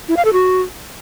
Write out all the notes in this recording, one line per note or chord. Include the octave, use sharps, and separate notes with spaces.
E4
F5
A4
F#4